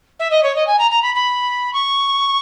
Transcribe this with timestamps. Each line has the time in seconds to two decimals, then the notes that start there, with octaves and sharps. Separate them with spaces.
0.19 E5
0.31 D#5
0.43 C#5
0.55 D#5
0.67 G#5
0.79 A#5
0.91 A#5
1.02 B5
1.15 B5
1.73 C#6